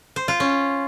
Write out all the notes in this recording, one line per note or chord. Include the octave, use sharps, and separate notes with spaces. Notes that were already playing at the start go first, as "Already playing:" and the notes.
C5
F4
C#4